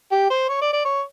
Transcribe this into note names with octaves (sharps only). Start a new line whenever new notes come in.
G4
C5
C#5
D5
D5
C#5